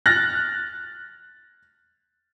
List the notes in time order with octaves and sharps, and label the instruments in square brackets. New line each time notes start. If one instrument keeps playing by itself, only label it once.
[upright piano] F6 F#6 A6 A#6